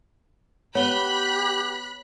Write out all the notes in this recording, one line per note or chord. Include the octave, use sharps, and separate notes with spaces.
B3 G4 C#5 B5 F#6 G7